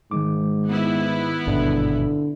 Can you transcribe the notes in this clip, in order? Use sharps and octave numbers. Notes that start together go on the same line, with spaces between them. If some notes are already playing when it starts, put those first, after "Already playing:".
G#2 D#3 G#3 D6
B3 E4
G#1 G2 B2 D3